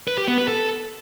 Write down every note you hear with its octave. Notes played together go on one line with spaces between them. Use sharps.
B4
G4
B3
B4
A4